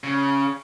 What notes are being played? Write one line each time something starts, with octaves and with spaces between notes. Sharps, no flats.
C#3